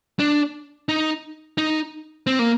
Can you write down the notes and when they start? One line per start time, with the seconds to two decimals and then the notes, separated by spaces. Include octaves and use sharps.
0.19 D4
0.89 D#4
1.58 D#4
2.27 C4
2.39 A#3